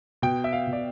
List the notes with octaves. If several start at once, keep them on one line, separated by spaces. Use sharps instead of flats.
B2 G5
E5
F5
B2
D5